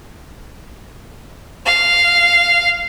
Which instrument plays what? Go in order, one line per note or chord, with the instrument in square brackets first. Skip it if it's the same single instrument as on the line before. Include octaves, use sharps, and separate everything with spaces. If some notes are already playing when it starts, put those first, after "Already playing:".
[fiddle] F5